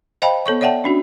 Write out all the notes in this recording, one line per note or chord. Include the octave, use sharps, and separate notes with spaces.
C5 D#5 F5 G5 A5 B5
B3 A4 C#5 C#6
C#5 D5 E5 F#5 G5 A5
C#4 D4 F#4